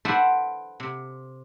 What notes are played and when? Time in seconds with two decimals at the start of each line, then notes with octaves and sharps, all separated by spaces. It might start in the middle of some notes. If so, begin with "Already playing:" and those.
0.05 A4 B4 C5 D5 E5 F#5
0.80 C3